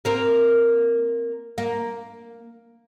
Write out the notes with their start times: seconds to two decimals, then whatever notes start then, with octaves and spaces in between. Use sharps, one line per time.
0.05 A#3 C4 A#4
1.58 A#3